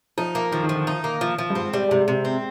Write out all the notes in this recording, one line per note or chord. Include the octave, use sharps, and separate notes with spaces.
F3 D#4
A#3
D#3 F3
D#3
F3
D3
D#4
A#3
F3
F3
G2
G#2 C4
G3
G#2 C3
C3
C4